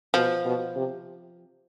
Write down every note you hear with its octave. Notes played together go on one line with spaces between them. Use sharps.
B2 F3
B2
C3